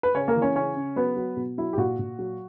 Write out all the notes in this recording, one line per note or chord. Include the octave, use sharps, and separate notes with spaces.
B4
C#3 C#4 C#5
A#3 A#4
E3
C#4 C#5
C#3 C#4 C#5
C#3
F#3 B3 B4
F#3
B2
F#3 E4
G4
A#2 F#4
A#2
F#3